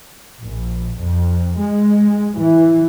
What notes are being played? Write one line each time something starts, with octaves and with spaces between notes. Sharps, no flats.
A#1
F2
G#3
E3